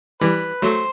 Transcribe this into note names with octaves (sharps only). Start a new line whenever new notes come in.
E3 G3 B4
F#3 A3 C5